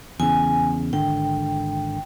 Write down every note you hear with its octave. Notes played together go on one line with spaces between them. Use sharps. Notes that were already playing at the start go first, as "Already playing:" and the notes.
E2 C#3 G#5
G#1 D3 G5